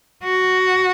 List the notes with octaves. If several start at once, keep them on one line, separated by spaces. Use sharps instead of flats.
F#4